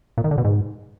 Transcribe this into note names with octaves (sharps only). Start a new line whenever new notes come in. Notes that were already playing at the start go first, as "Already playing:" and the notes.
A#2
D#3
D3
B2
G#2